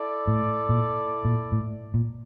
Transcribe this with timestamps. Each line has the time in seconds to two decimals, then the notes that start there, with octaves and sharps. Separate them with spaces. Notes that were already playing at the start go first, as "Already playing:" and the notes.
Already playing: E4 A4 D5
0.27 A2
0.69 A#2
1.25 A#2
1.52 A2
1.94 A#2